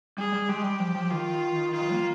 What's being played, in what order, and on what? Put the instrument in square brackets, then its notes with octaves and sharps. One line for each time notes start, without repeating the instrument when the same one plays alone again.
[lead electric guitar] G3 [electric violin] G#4
[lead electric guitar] G3
[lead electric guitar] G#3 [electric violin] G4
[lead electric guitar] G3
F3
F3
[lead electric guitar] D#3 [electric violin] F4
[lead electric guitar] D#3 [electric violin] F4
[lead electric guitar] D#3
A#3